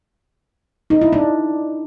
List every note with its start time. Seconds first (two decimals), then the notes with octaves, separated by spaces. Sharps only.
0.90 D#4
1.01 E4
1.13 D4